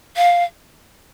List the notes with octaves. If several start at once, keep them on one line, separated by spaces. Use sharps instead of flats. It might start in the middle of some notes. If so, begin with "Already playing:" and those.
F5